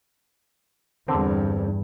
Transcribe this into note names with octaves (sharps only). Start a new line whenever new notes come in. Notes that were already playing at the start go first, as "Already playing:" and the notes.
E2 G2 D3 C4 A#4